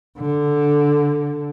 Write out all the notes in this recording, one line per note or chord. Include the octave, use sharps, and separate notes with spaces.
D3